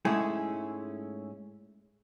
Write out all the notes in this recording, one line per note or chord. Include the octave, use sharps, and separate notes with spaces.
G#2 G#3 A3 C#4 E4 G#4